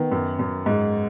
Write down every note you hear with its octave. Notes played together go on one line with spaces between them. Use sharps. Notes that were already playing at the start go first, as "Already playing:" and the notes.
Already playing: D#3 B3
F#2
F#2
G#2